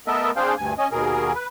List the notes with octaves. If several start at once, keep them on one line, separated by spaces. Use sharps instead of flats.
A3 B3 A4 A#4 D#5 E5
C4 D4 G#4 C5 F5 G5
D2 G2 G#5
C#4 D#5 G#5
D#2 B2 G#4 A#4
B4